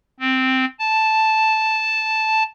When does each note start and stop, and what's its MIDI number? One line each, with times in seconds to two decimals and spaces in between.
0.20 0.65 60
0.79 2.43 81